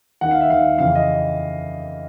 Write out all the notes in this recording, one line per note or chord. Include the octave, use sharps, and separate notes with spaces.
D#2 D#3 F#5
F5
E5
D#2 D#3 F5
F2 C#3 E3 F5
D#5